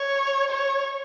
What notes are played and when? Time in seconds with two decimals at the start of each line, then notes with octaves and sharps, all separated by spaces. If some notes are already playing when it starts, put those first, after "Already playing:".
Already playing: C#5
0.50 C#5